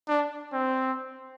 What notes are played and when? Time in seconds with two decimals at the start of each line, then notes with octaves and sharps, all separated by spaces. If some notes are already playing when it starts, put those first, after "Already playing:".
0.08 D4
0.53 C4